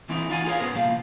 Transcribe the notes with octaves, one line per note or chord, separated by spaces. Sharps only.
E3 C4 D#4 E4
D#4 F4 F#4 D5 F5 G#5
F4 G#4 A#4 C5 C#5 F5
B3 C#4 D4 G#4 A#4 C5
C2 A#2 F3 F4 F5